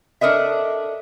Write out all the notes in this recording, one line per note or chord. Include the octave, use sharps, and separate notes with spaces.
D4 A4 A#4 D#5 E5